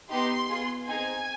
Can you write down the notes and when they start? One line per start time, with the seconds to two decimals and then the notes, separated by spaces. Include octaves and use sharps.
0.10 B3 D#4 G4 C6
0.48 B3 F4 G#4
0.87 C4 D#4 G#4 G#5